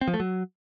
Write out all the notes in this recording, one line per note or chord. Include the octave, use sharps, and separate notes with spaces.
C4
F3
A3
F#3